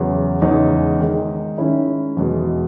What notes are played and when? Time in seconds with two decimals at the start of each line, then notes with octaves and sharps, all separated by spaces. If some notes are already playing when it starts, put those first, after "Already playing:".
Already playing: E2 C#3 F#3
0.42 E2 C#3 G#3 D#4
0.99 D#3 G#3 D#4
1.58 D#3 G#3 C#4 E4
2.17 E2 B2 G#3